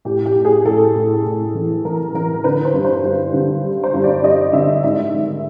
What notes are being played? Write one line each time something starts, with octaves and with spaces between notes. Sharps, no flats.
A2 G4
G4
A2
G#4
A2 A4
A2
A2
E3
E3 A#4
E3 A#4
D3 B4
C5
G2
C5
G2
D3
G3
C5
G2
D5
G2 D#5
D3 E5
G#2 E5
D#3